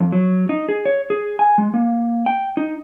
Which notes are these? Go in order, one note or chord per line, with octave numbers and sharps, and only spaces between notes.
F2
F#3
D#4
G#4
C#5
G#4
G#5
G#3
A#3
G5
D#4